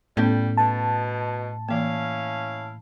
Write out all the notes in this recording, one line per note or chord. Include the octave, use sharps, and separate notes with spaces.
A2 G3 B3 C#4 A4
B2 A5
E3 A#3 C#4 E4 F5